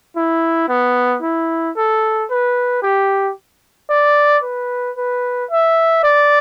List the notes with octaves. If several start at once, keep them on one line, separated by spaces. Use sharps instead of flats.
E4
B3
E4
A4
B4
G4
D5
B4
B4
E5
D5